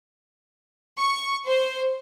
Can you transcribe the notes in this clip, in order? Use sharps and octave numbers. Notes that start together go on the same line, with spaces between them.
C#6
C5